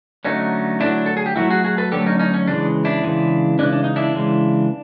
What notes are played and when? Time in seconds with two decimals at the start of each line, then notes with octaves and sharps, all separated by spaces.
0.25 D3 F#3 A3 C#4 D#4
0.80 D3 F#3 A3 D4 E4
1.06 A4
1.17 G#4
1.26 G4
1.36 D3 F#3 A3 E4 F#4
1.50 F#4 G#4
1.64 F#4 G#4
1.78 A4 B4
1.92 D3 F#3 A3 G4 A4
2.06 C#4 D#4
2.19 C#4 D#4
2.34 C#4
2.48 C#3 E3 G#3 D4
2.85 D4 E4
3.04 C#3 E3 G#3
3.59 C#3 E3 G#3 D4
3.73 D4
3.84 D#4
3.96 D4 E4
4.15 C#3 E3 G#3